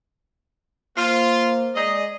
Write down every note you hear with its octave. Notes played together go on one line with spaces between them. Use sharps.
A#3 F4 C5
G#3 G#4 D5 D#5